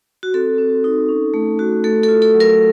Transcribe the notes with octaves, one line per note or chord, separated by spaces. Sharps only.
F#4
C4 A4
C4
D#4
C#4
A3
F#4
A3 A4
A4
F4
A4
F#3
A#4